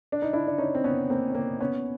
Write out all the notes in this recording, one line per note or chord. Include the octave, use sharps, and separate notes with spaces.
D4
D#4
D4 E4
D4
C#4 D#4
C4
B3 C#4
A#3 C4
C#4
A#3 C4
B3 C#4